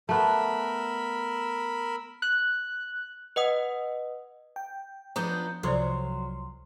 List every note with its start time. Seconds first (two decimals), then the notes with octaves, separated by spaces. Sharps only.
0.09 A3 B3 A#4 B5 E6
2.22 F#6
3.36 B4 D#5 F#5 D#6
4.56 G5
5.16 F3 B3 D4 F4 A#5 D#6 G6
5.63 C2 F3 F#3 A4 C5 D5 C6